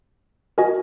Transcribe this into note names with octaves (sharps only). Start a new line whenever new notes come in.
F#4 A#4 D#5 G#5